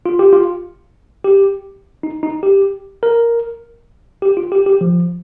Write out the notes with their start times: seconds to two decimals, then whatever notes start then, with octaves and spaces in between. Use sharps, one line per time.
0.06 F4
0.19 G4
0.33 F4
1.25 G4
2.03 D#4
2.23 D#4
2.43 G4
3.03 A#4
4.22 G4
4.37 F4
4.52 G4
4.66 G4
4.81 F3